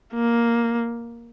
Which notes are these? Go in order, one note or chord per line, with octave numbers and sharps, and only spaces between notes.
A#3